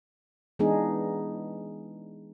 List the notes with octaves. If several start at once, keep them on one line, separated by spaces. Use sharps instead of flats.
E3 G#3 B3 D4 D#4 G#4